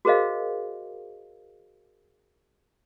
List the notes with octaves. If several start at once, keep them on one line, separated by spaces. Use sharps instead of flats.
F#4 G#4 A#4 C5 D#5 F5